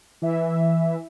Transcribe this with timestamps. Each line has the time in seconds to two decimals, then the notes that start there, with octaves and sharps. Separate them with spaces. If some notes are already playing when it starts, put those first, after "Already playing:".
0.22 E3 E5